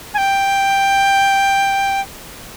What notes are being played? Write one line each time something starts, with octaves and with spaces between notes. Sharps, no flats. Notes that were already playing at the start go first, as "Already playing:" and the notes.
G#5
G5